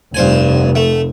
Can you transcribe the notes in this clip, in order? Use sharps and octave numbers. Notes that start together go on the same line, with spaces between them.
F1 G2 C5 G#5
A3